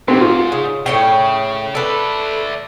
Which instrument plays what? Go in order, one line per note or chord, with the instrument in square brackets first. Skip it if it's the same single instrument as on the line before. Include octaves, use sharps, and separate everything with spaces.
[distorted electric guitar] G#2 [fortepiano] C4 G4
[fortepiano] F4
[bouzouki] C#3
[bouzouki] A2 C#5 G5 [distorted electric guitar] C#3
[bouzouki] A4 B4 [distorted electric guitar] D5 E5